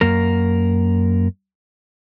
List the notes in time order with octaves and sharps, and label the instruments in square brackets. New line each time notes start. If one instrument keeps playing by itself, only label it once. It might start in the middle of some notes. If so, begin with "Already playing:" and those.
[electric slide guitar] F#2 A#3 A#4